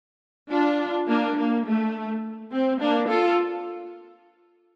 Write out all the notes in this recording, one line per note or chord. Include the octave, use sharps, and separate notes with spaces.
D4 F4
A#3 D4
A#3
A3
C4
A#3 D4
F4 A4